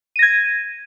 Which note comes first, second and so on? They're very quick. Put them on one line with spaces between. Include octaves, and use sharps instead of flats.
D#7 A#6 G#6